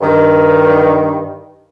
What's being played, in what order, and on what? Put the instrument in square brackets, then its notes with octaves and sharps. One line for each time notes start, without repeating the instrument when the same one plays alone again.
[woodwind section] G2 D#3